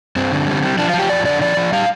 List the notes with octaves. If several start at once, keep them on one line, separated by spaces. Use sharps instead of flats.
G2 C4
D3
G3
G3
F3 D4
F4
F3
G4
F2 D5
D3 D5
F3 D5
F3
G3 F5